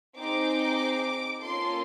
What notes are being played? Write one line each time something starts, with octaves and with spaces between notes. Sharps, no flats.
C4 D#4 G#4 D6
A#3 C#4 F4 A4 C6